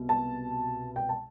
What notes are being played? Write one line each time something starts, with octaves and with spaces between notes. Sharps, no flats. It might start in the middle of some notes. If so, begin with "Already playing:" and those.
Already playing: C2 B2
A5
G5
A5